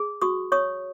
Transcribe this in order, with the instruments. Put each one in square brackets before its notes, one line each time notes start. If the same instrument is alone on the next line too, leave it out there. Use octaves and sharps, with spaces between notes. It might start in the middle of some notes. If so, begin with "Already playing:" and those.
Already playing: [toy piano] G#4
F#4 C#6 D#6
C#5 C#6 D#6